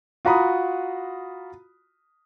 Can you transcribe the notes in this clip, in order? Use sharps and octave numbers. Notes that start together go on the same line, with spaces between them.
F4 F#4 A#5 B5 D#6